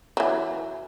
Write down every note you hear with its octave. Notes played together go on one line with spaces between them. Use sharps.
E3 F#3